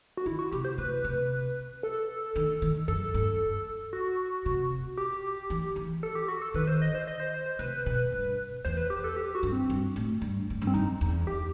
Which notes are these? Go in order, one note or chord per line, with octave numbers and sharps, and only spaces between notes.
F#4
D#3 E4
F#4
C3 G4
C5
C3 B4
C3
A4
D#3
D#3
F#2 A4
G2
F#4
C3
G4
E3
E3
A4
G4
F#4
A4
D#3 B4
C5
D#5
C5
D#5
C5
C5
C5
C3 B4
B2
G2
E2 C5
B4
G4
A4
G4
F#4
G2
C4
G2
A2
G2
A2
G2
C4
F#2 D#4
E2
G4